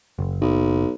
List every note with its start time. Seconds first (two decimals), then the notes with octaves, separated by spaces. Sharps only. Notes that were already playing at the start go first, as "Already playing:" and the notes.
0.19 F#1
0.41 B1